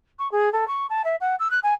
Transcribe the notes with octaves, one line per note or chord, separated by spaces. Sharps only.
C#6
G#4
A4
C#6
A5
E5
F#5
E6
F#6
G#5